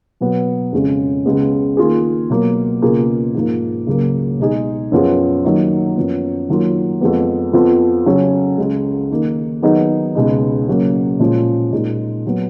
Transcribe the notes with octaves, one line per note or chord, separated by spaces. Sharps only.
B2 F#3 B3
F2 C#3 G#3 C#4
C#2 C#3 G#3 B3
D#3 A#3 F4 G#4
B2 F#3 A#3
C#2 B2 A#3 F4 G#4
G#2 F3 A#3
C#2 C#3 F#3 A#3
B2 G#3 D#4 G#4
F#2 F3 B3 F4 G#4
D#3 F#3 A#3 D#4
F#2 F3 B3
D#3 F#3 A#3 F4
F2 F3 G#3 B3
F2 F3 B3 F4
C#3 F#3 C#4
C#2 C#3 G#3
D#3 A#3 D#4
D#3 F#3 B3 D#4 G#4
C#2 B2 G#3 D#4
C#3 F#3 A#3
A#2 F3 G#3 C#4 F4
A#2 G#3 D#4
F#3 B3